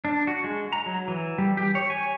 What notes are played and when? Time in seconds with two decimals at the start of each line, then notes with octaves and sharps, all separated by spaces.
0.05 D4
0.27 F#4
0.44 G#3
0.73 A#5
0.86 F#3
1.08 E3
1.38 G3
1.57 G4
1.75 C#5
1.90 G#5